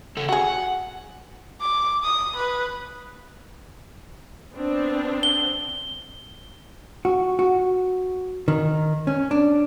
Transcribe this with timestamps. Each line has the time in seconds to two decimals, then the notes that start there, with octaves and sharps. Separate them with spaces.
0.17 C#3 A4
0.29 F#4 G#4 F#5
1.61 D6
2.03 D#6
2.37 B4
4.54 B3 C4 D4
5.23 G7
7.05 F#4
7.39 F#4
8.48 D#3
9.07 C#4
9.31 D4